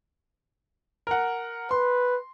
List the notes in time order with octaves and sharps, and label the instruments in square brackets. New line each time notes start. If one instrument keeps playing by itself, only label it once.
[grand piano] A#4 F#5
[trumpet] B4 [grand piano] C6